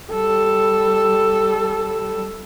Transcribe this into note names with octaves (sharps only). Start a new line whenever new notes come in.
G3 A4